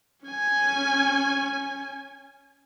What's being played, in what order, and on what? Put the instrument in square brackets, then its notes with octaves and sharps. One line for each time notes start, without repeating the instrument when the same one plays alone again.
[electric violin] C#4 G#5